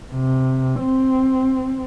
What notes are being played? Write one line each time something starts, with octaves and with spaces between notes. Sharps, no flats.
C3
C4